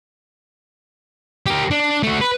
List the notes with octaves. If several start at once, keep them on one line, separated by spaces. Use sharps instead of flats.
G4 A#4
D4
A3 F#4
B4